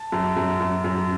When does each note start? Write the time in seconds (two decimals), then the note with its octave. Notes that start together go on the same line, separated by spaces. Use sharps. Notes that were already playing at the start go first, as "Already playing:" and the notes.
Already playing: A5
0.12 F#2
0.37 F#2
0.61 F#2
0.84 F#2